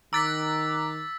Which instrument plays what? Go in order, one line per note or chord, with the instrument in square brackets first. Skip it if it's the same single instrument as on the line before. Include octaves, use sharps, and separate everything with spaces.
[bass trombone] D#3 [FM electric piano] A#5 D6 F#6 [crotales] E6 A6 B6